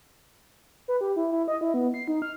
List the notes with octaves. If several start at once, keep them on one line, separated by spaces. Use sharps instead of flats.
B4
G4
E4
E4
D#5
E4
B3
C7
D#4
F6